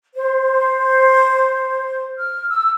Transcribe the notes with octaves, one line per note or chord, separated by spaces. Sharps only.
C5
F6
E6